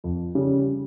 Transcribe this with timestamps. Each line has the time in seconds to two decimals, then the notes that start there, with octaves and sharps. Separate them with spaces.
0.04 F2
0.35 C#3 G3